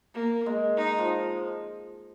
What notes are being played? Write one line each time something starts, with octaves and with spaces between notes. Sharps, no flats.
A#3
G#3
D#4
F3